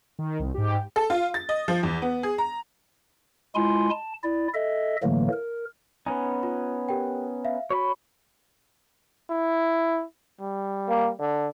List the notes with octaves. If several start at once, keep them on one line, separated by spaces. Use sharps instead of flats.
D#3
C2
G#2 G4
A4
F4
A6
D#5
F3
E2
B3
G#4
A#5
G#3 E4 F4 G#5 C6
A5
E4 D5
A4 D#5 E5
A2 D3 E3 F#3 A3 A#3
A#4
B3 C#4 D#4 G#5
F4 B5
G4 A#4 G5
E5 F5
F#4 C#5 B5
E4
G3
A#3
D3